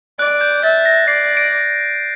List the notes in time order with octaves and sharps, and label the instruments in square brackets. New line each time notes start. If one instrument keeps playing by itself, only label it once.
[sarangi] D5 [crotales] F#6
[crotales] G6
[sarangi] E5 [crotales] A6
[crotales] A#6
[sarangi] D5 [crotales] C7
[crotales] D7